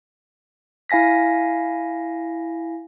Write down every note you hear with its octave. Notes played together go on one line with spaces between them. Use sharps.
E4 F5 G#5 A#6 B6